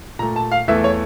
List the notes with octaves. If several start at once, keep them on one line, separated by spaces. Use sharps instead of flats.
A#2 A3 A#5
A5
F5
E2 E3 A3 E5
C#5